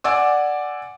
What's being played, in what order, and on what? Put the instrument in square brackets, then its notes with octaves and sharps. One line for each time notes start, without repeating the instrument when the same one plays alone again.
[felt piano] D5 F#5 G#5 D6 E6